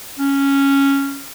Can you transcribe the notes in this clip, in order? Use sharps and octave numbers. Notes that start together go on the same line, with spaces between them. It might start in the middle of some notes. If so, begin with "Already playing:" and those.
C#4